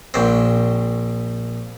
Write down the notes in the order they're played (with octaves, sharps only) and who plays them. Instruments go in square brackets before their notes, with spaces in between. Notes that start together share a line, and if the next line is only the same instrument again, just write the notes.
[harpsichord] A#1 C4